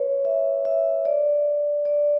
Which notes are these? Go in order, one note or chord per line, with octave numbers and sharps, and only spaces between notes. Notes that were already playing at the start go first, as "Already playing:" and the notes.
Already playing: B4 C#5
E5
E5
D5
D5